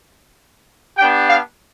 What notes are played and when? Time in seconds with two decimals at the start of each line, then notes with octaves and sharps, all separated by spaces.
0.98 B3 D4 G4 G5
1.27 F5